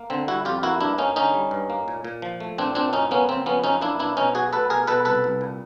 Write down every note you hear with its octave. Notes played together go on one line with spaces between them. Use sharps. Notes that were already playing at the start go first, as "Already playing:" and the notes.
Already playing: A#3
D3 C4
G3 E4 F#4
F2 F4 G4
A#3 E4 F#4
G2 D4 E4
A#3 C#4 D#4
D3 C#4 D#4
G3
G2
A#3
A#2
A#2
F3
A3
A#2 C4 D4
A#2 C4 D4
F#2 C#4 D#4
A#3 B3 C#4
C#3 C4
F3 B3 C#4
F#2 C#4 D#4
A#3 D4 E4
B2 D4 E4
B2 C#4 D#4
F#3 F#4 G#4
A3 A4 B4
B2 G#4 A#4
B2 A4 B4
C2 A4 B4
C2
A#2